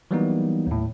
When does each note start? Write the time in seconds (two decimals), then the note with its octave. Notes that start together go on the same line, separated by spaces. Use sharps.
0.11 E3 F#3 G3 A#3 B3 D#4
0.67 D#2 A2